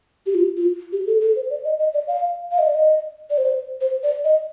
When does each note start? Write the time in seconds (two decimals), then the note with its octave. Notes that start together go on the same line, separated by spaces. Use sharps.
0.26 G4
0.35 F4
0.57 F4
0.92 G4
1.07 A4
1.21 A4
1.36 C5
1.50 D5
1.65 D#5
1.79 D#5
1.94 D5
2.08 F5
2.51 F5
2.58 D#5
2.66 D5
2.74 D#5
3.30 D5
3.38 C5
3.81 C5
4.03 D5
4.24 D#5